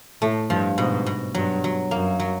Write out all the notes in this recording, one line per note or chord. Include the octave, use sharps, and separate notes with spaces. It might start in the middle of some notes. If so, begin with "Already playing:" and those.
A2 A3
G2 F3
G#2 B2
B2
G2 F#3
F#3
F#2 A#3
F#3